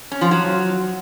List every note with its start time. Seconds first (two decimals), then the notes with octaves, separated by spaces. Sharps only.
0.12 C#4
0.21 F3
0.31 F#3